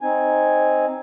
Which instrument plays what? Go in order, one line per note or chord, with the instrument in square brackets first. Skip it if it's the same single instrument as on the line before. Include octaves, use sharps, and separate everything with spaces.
[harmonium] C4 D#4 G#5